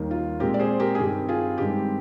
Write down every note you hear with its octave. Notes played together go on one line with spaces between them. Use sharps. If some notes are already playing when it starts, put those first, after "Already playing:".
Already playing: D#2 D#3 G3 A#3
F4
A#2 G#3 C4 G4 A#4
D5
G#4 C5
G4 A#4
G#4
G2 D#3 G3 C4 G4
F4 G#4
G2 D#3 G#3 C4 G4